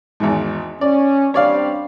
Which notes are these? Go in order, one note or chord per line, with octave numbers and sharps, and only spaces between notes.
G#1 E2 G#2
C#4 D5
G3 C4 D4 C#5 D5 F5